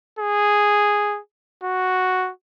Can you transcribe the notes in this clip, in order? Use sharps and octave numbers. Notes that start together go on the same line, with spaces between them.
G#4
F#4